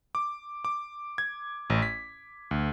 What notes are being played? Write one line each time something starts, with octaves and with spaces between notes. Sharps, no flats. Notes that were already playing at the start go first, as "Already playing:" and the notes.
D6
D6
G#6
A1
B6
D2